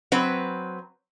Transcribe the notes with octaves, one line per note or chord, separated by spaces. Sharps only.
F#3 C4 B4